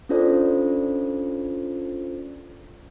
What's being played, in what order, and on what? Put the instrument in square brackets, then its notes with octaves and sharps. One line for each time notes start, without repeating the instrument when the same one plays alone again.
[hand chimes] C#4 D4 F4 A4 C5 D5